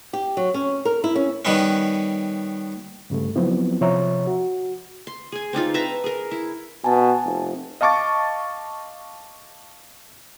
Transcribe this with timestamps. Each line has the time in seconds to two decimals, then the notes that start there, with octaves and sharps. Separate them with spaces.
0.13 G4
0.37 F#3
0.54 C#4
0.85 A#4
1.04 E4
1.16 C#4
1.45 D#3 G3 B3 C#4
3.10 G2 C#3 G3 A3
3.36 F3 F#3 B3 C4 E4
3.81 C3 F3 C#5 E5 A#5
4.27 F#4
5.07 C6
5.32 G#4 G#5
5.53 C4 D4 D#4 F4
5.74 B4 E5 A5 A#5
6.04 G#4 A#4
6.31 E4
6.84 B2 G#5 A5
7.24 F1
7.81 D#5 F5 A5 C#6 D6 A6